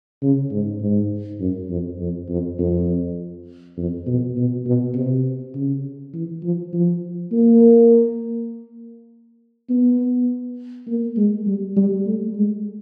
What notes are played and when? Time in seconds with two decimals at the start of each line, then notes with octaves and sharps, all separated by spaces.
0.22 C#3
0.52 G#2
0.81 G#2
1.40 F#2
1.70 F2
1.99 F2
2.29 F2
2.59 F2
3.77 F2
4.07 B2
4.37 B2
4.66 B2
4.95 C3
5.55 C#3
6.14 E3
6.43 F3
6.73 F3
7.32 A#3
9.69 B3
10.87 A#3
11.17 G#3
11.47 G3
11.77 G3
12.06 A3
12.36 G#3